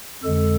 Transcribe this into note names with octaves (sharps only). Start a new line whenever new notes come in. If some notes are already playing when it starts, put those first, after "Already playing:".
F2 D3 G#3 A4